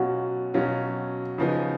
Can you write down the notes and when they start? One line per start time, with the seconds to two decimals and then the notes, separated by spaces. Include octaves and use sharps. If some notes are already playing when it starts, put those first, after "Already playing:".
Already playing: B2 F#3 C#4 F4 F#4
0.54 B2 F#3 C#4 F4
1.38 C#3 F3 B3 D#4